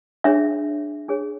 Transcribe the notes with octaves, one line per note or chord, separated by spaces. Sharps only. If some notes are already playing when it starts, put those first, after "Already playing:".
D4 G#4 C#5 E5
D4 G#4 C#5